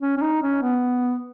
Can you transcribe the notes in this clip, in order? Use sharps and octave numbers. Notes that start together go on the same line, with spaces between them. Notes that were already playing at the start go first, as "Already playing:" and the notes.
C#4
C#4
D#4
C#4
B3